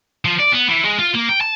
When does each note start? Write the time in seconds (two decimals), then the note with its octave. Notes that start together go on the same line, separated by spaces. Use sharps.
0.25 F3
0.39 D5
0.52 B3
0.69 E3
0.85 G#3
0.99 F4
1.15 A#3
1.29 G5
1.41 A5